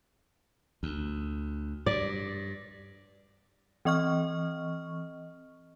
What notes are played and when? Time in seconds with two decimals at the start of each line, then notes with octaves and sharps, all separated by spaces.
0.83 D2
1.86 G2 D5
3.85 E3 C4 D#5 C#6 F6